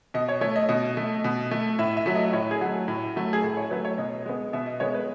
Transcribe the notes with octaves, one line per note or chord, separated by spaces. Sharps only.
B2 D#5
C#5
A3 C#5
D#5
B2 D#5
A3
B2
A3
A2 E5
E5
F#3 A3
D#5
A2 C#5
G#4
F#3 A3 F#4
A2
F#3 A3
G#4
A2 A4
C#5
F#3 A3 B4
C#5
B2 D#5
G#3 B3
B2 E5
D#5
G#3 B3 C#5
B4